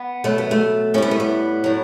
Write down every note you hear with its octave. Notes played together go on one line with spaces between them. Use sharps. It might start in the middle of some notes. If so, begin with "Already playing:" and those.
Already playing: B3
B2 F#3 A3
B3
A3
A2 G3 B3 C#4
A3
B3
A2 F#3